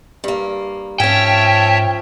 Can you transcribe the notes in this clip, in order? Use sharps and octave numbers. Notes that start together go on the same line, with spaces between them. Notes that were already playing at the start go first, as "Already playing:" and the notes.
G2 A#3
G#2 F3 C#4 C#5 E5 G5 A5